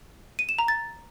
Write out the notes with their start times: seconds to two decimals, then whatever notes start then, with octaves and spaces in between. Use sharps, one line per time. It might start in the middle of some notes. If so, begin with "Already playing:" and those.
0.39 D#7
0.49 E7
0.58 A#5
0.68 A6